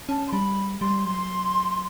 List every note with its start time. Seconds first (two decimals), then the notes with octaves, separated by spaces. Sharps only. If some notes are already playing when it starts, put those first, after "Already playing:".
0.09 C#4 A5
0.27 C6
0.32 G3 B5
0.81 G3 C6
1.05 F#3 C6